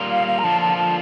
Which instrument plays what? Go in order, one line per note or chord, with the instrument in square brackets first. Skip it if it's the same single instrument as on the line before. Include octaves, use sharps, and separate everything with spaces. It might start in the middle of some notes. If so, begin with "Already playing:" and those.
Already playing: [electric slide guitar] G3 A#3 F4
[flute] F5
F5
A#5
[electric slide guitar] D3 F3 A#3 F4 [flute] A5
[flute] A5
A5